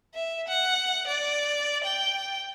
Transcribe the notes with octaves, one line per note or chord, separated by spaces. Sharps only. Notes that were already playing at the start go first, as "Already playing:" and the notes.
E5
F#5
D5
G5